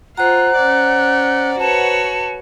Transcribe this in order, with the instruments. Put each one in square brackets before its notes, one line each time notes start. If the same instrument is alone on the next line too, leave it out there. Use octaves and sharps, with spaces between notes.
[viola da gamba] F4 [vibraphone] C5 A#5 [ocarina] F#5 [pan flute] F#6
[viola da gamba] C#4 D5
[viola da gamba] F#4 B4 C#5 [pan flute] A5